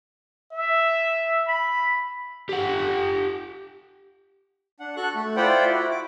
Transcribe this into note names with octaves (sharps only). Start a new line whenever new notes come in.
E5
B5
G4 F#5
D4 F#5
F#4 A4 C#6 F#6
A3
E4 F4 C5 D5 F#5 G5
E4 F#4
D6